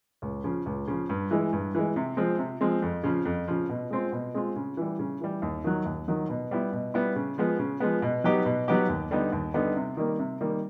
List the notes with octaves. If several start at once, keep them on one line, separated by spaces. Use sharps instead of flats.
C#2
C#3 F3
C#2
C#3 F3
G2
E3 G#3
G2
E3 G#3
C3
F3 G#3 C4
C3
F3 G#3 C4
F2
C#3 F3
F2
C#3 F3
B2
G#3 C4 F4
B2
G#3 C4 F4
C#3
E3 G3
C#3
E3 G3
D#2
D#3 F#3
D#2
D#3 F#3
B2
G3 B3 E4
B2
G3 B3 E4
C#3
F3 G#3 B3
C#3
F3 G#3 B3
B2
F#3 B3 D#4 G4
B2
F#3 B3 D#4 G4
D#2
D3 G3 B3 D#4
D#2
D3 G3 B3 D#4
C3
D#3 G3 A#3
C3
D#3 G3 A#3